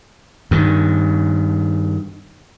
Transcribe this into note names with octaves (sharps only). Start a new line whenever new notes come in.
G2 D#3